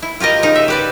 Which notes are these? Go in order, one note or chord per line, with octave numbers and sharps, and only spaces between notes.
E4
F4 G4 A#4 D#5
C#3 D#4
E5
G4 B4 D5